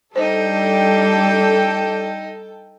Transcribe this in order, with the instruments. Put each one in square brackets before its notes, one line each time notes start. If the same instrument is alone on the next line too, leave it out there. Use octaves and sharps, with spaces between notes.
[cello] G3 D4 [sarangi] D#4 [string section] A4 G5 [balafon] C5